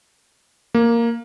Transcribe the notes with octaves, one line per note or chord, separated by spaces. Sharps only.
A#3